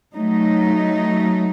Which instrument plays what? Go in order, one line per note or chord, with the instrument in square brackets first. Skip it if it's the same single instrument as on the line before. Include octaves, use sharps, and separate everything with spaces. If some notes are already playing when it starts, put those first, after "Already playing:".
[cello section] F#3 A3 D#4